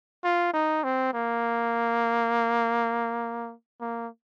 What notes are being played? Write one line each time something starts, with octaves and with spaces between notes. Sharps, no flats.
F4
D#4
C4
A#3
A#3